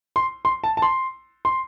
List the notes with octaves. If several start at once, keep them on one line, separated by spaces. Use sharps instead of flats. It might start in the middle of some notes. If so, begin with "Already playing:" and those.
C6
C6
A5
A5
C6
C6